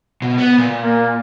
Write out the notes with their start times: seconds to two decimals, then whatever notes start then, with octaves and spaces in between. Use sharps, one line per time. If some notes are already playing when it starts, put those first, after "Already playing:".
0.22 B2
0.38 B3
0.58 A#2
0.81 A#3